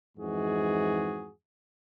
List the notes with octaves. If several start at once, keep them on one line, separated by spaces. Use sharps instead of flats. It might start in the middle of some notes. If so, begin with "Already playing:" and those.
F2 G#2 E3 G#3 F#4 G#4